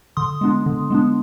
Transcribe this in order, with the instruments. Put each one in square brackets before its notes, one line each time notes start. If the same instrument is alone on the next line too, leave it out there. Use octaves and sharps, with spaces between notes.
[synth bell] D3 C6 D#6
G#3 B3 D4
D3
G#3 B3 D4